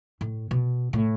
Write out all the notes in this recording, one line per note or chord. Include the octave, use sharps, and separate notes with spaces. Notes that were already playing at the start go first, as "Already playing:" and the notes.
A2
B2
A2